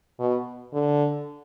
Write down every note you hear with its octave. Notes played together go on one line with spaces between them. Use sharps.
B2
D3